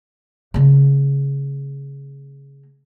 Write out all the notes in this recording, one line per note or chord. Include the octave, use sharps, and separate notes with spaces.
C#3 A#3